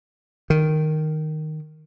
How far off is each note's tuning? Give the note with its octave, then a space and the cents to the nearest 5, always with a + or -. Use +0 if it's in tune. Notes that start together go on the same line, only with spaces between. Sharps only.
D#3 -5